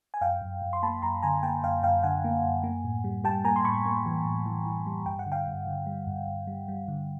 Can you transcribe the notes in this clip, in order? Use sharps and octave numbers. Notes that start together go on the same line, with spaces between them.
G#5
F#2 F5 G5
F#2
F#2
C6
A#3 A5 B5
F#2 A#5 C6
D3 G#5 A#5
A#3 G5 A5
F#2 F5 G5
F#2 F5 G5
D3 F#5 G#5
A#3
F#2
A#3
A2
G3
G3 G5 A5
A#3 G#5 A#5
C6
A2 B5 C#6
A#3
E3
A2
E3
E3
G3
G2 G5
F#5
D3
F5 G5
G2
D3
G3
G2
G2
G3
G3
D3